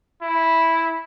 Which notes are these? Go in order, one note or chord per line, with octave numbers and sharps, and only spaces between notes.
E4